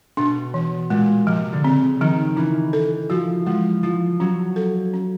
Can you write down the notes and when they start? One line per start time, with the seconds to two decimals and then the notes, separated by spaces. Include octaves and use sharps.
0.17 B2 D4
0.54 E3
0.90 A#2 G#3
1.27 C3 F3
1.52 D3
1.63 C#3 C4
2.01 D#3 F3
2.37 E3 C#4
2.73 A4
3.10 F3 F#4
3.46 F3 G#3
3.83 F3 E4
4.20 F#3 C#4
4.56 A4
4.93 C#4